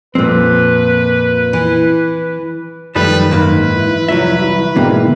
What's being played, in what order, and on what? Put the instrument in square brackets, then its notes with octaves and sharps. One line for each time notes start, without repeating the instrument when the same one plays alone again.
[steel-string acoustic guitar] F2 A#2 [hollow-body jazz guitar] C4 [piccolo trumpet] B4
[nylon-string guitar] E3
[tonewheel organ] F#2 D#3 [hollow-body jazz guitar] F3 G3 A3 [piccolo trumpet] B4
[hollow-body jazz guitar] G#2 A#3 F5 [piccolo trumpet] B4 [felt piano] F#6
[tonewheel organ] E3 E4
[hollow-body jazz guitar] C2 F#3 E5 [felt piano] F2
[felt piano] F#4
[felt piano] G#2 B2 G5 [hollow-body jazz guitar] D3 A#3